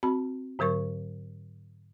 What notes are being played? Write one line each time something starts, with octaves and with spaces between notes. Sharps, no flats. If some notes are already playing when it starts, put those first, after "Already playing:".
C4 F#4 A5 B5
G#2 D3 F#3 A#4 C#6